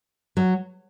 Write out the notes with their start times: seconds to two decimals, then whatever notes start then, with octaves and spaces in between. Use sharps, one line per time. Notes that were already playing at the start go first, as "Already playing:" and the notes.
0.37 F#3